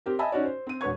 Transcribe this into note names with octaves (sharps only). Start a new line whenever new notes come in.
C4 G4 A#4
D#5 E5 G#5 A5 B5 E6
C#4 D#4 F#4 C#5 D5
C5
C4 D#7
E1 D4 B4 C#5 C#6 G#6